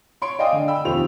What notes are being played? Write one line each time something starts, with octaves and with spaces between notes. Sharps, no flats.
C#5 C6 D7
D5 D#5 F5 G5 G#5 D#6
D3
G5 B5 E6
F1 D#2 F4 G4 C5 F7